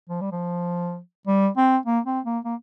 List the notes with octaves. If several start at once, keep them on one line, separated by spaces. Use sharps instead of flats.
F3
G3
F3
G3
C4
A#3
C4
A#3
A#3